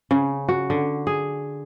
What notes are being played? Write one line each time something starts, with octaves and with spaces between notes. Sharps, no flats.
C#3
F#4
D3
G#4